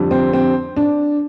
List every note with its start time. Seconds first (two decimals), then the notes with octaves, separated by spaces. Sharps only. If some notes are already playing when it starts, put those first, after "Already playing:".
Already playing: F2 D3 G3
0.11 C4
0.33 C4
0.77 D4